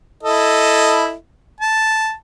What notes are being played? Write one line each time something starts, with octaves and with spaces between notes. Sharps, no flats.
E4 A4 D#5
A5